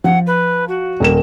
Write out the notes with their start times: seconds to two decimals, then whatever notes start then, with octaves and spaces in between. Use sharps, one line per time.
0.04 F3 F#5
0.26 B4
0.68 F#4
1.00 D#1 A#4 E7